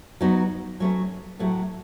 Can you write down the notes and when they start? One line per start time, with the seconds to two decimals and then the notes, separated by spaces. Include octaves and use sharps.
0.21 F#3 B3 D#4 F#4
0.80 F#3 A3 C#4
1.39 A2 F#3 A3